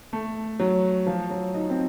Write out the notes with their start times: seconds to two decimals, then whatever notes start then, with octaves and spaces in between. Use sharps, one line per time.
0.13 A3
0.60 F#3
1.07 F3
1.30 F#3
1.54 D#4
1.70 C4